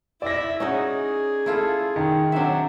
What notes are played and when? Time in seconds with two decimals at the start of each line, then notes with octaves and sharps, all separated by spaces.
0.22 E4 D5 E5 A#6
0.60 C#4 D#4 F#4 G#4
1.46 E4 F4 A4
1.96 D#3
2.32 F#3 C4 D4 E5